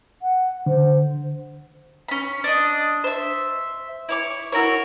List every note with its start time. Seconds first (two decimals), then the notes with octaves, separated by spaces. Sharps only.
0.21 F#5
0.66 D3 C5
2.08 C#4 B5
2.44 D4 D#5
3.04 C5 E5
4.09 E4 C#5 D6
4.52 E4 F#4 A#4 C#5